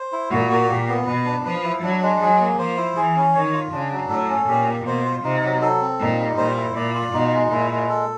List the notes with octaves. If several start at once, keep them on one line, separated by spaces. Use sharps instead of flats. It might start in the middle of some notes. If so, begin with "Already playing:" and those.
Already playing: C5
E4
A#2 F#4
A#3
A#2 G4
B3
B2 B4
D4
F3 B4
E4
F#3 D4
G#3
F#3 G#4
A#3
F3 C5
E4
E3 G#4
C#4
D#3 C#5
F4
C#3 D4
F#3
A2 A4
C#4
A#2 G4
A#3
B2 C5
F4
C3 D#4
F#3
A4
C4
A#2 D#4
G3
A#2 C5
E4
A#2 D5
F4
B2 D#4
G#3
A#2 E4
G#3
A4